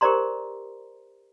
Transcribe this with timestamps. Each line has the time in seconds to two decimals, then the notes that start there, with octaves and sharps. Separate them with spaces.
0.01 G4 A#4 C5 D5 A#5 C6